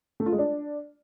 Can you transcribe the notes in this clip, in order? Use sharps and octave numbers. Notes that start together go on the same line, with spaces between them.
A3
F4
G#3
D4